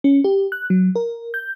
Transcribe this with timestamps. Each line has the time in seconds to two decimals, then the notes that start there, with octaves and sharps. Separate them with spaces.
0.04 C#4
0.24 G4
0.52 F#6
0.70 F#3
0.95 A#4
1.34 G6